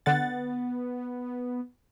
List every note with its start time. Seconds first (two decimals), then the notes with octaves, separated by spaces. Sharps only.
0.06 D3 B3 F#5 A6